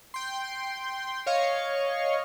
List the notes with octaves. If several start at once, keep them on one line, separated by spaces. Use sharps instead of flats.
G5 C6
C#5 D#5 F5 C#6